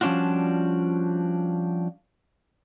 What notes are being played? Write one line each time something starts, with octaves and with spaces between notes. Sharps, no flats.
F3 G3 C#4 D4 F4 F#4